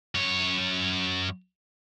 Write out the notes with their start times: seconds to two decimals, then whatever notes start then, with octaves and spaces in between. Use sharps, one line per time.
0.15 F#2 C#5